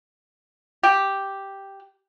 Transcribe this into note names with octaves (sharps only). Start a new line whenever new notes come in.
G4